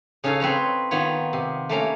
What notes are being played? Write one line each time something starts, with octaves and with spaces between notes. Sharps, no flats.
C#3 C#4 D#4 A4 C#5 F5
C4 B4 C#5 A#5
D#3 B3 F4 C#5
C3
A3 A#3 C#4 A#5